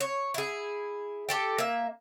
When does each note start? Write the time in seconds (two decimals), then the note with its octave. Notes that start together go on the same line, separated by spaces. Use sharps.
0.01 C#5
0.34 E4 G#4
1.29 G4 A4 G5
1.58 A#3 E5